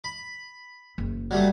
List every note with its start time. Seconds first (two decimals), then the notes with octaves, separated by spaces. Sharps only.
0.04 B5
0.98 F#1
1.31 F#3 G3 A3